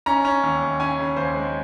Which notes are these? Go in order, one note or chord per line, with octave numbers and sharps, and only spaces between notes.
C#4 A#5
C#4
D#2
D#2
C#4 G#5
C#3
D#2 C5
G#3